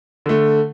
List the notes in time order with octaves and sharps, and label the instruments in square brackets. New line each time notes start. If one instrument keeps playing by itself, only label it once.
[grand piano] D3 A3